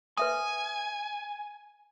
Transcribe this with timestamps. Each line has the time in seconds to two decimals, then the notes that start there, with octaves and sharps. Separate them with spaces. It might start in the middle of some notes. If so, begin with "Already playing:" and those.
0.17 B4 E5 G#5 D#6